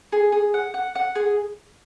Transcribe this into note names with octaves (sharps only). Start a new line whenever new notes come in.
G#4
G#4
F#5
F#5
F#5
G#4